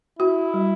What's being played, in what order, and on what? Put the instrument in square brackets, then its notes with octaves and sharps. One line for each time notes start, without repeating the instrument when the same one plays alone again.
[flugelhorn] E4 [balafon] F#4
[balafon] G3